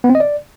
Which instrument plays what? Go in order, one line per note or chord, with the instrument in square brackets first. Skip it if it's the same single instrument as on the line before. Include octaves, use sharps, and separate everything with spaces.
[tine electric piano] B3
C4
D#5
D5